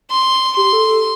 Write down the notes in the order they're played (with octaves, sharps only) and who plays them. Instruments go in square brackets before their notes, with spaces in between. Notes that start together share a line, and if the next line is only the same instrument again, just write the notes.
[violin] C6
[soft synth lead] G4 [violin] C6
[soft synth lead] A4
A4